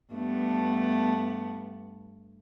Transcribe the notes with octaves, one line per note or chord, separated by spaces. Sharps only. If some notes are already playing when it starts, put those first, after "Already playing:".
G2 A3 B3